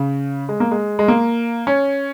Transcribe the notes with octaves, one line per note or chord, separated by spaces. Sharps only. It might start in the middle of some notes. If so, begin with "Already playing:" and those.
Already playing: C#3
G#3
A#3
G#3
G#3
A#3
C#4